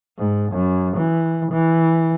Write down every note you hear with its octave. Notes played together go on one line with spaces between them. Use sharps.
G#2
F#2
E3
E3